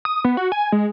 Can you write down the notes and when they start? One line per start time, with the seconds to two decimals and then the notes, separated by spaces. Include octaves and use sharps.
0.05 D#6
0.25 B3
0.37 F#4
0.52 G#5
0.72 G#3